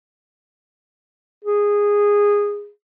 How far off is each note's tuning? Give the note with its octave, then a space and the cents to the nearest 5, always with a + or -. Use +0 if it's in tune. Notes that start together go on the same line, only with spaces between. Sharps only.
G#4 -15